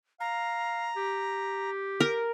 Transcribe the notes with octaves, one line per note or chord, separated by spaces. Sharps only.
F5 A#5
G4
A#4